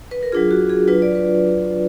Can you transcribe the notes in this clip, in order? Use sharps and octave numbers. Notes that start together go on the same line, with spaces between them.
B4
A#4
F#3 D4 F4 G#4
F#4
G#4
F#3 D4 F4 B4
D5
B4